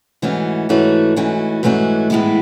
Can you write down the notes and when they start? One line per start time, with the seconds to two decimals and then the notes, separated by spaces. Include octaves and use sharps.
0.22 G#2 E3 A3 C#4 F#4
0.69 G#2 E3 A3 C#4 F#4
1.17 G#2 E3 A3 C#4 F#4
1.63 G#2 E3 A3 C#4 F#4
2.10 A2 E3 G#3 B3 E4